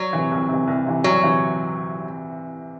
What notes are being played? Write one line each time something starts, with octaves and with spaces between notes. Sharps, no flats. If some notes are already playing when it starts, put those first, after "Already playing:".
Already playing: F#3
C3 E3
C2
C3
E3
C2
C3 E3
C2 F#3
C3 E3